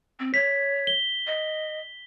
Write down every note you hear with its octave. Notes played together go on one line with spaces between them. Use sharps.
C4
C#5 B6
G7
D#5